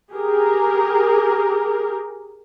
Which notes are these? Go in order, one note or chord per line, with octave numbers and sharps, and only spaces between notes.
G4 G#4 A#4